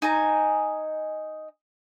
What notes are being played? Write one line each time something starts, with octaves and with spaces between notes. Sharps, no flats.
D#4 G#5 A#5